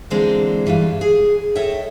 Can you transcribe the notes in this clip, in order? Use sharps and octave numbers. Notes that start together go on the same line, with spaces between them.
D3 E3 G#3 A#3 C4 D4
G2 E3 G3 G#4 F5
G#4
A4 C#5 D#5 E5 G5